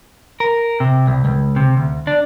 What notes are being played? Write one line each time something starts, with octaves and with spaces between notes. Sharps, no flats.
A#4
C3
C2
C#2
C3
D2
D4